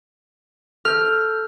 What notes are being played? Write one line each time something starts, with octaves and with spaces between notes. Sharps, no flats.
A4 F6 G6